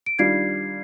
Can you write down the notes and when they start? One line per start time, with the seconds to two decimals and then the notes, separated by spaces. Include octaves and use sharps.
0.06 D7
0.19 D#3 G3 D4 F4 G#6 C7